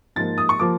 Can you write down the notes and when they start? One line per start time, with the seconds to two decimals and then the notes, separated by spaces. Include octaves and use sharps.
0.16 G#2 F3 A#3 A6
0.38 D#6
0.49 C#6
0.59 F3 A#3 D6